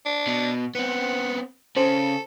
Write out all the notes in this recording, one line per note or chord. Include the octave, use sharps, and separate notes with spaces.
D4
B2
B3 C4 F#5
C#3 A4 C5